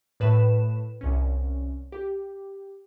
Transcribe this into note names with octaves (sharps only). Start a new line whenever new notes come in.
A2 B4 E7
C2 C#4
G4